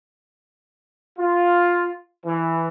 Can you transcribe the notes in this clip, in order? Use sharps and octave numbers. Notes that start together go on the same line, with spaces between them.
F4
E3